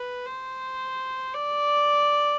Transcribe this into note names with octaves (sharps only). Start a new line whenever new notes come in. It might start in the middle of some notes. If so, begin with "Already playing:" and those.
Already playing: B4
C5
D5